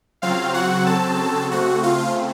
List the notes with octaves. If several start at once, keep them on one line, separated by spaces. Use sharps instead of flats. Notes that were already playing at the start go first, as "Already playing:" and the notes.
C#3 F#3 C4 F4 F5
F#4 F#5
A4 A5
C#3 A3 C4 F#4 F#5
F4 F5